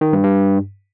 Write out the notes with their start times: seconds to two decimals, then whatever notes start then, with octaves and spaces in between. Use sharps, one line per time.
0.01 D#3
0.13 G2
0.24 G2